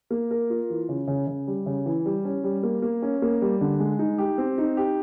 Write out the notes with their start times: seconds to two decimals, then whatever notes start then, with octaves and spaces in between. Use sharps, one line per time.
0.10 A#3
0.31 A#4
0.50 F4
0.70 E3
0.89 C#3
1.08 C#3
1.27 C#3
1.48 G3
1.66 C#3
1.86 E3
2.06 G3
2.25 C#4
2.44 G3
2.63 A#3
2.82 A#3
3.02 C#4
3.22 A#3
3.42 G3
3.61 D3
3.80 G#3
3.99 D#4
4.18 G4
4.38 C4
4.58 D#4
4.77 G4